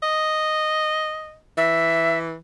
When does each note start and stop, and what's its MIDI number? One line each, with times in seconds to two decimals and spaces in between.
0.02 1.38 75
1.57 2.35 52
1.57 2.19 76